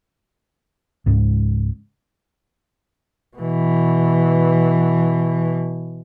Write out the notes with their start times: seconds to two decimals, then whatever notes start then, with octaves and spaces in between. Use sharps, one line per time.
1.06 C#2 G#2 C#3 G#3
3.37 B2 E3